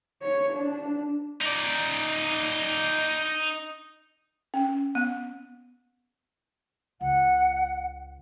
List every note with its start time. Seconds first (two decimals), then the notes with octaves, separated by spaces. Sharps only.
0.22 C#5
0.53 D4
1.41 D#4 D5
4.54 C#4
4.95 B3
7.01 C#2 F#5